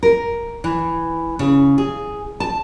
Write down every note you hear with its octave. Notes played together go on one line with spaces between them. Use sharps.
A#4
E3
C#3
G#4
A5